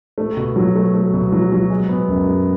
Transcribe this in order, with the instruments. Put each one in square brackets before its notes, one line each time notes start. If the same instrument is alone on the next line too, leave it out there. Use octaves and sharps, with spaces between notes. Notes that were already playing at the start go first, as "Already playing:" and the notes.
[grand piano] A3
B2
F#3
A3
A3
B2
F#3
F#3
G#3
B3
F#2
G#3